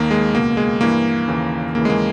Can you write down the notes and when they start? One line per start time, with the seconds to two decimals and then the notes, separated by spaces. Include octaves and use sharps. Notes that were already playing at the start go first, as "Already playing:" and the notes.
Already playing: D#2 D#3 A#3
0.11 G#3
0.34 C#2 B2 A#3
0.57 G#3
0.81 G2 E3 A#3
1.28 D#2 C#3 E3
1.75 D#2 C#3 E3 A#3
1.85 G#3
1.90 A#3